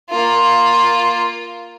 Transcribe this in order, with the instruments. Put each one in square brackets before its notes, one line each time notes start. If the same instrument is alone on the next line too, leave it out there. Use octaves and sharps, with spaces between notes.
[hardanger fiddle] A#3 F4